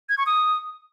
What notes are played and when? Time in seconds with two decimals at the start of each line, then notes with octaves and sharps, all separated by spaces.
0.09 G#6
0.18 C#6
0.26 D#6